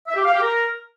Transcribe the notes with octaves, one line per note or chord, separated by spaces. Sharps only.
E5
G4
F5
G4
A#4